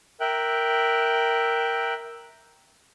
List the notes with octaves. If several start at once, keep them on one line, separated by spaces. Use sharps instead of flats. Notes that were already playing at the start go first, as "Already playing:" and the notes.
A#4 E5 G5 F#6